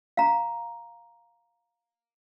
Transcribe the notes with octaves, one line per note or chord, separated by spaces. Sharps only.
F5 A#5